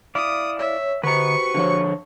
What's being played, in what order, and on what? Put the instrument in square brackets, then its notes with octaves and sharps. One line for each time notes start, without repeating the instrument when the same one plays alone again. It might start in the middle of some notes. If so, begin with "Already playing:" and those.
[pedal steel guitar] E4 D5 F5 [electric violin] D#6
[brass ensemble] C#5 [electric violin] E5
[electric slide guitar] D3 A#5 [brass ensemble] F#4 G4 C5 [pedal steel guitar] B4 [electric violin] C#6 C#7
[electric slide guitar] D3 F3 C#5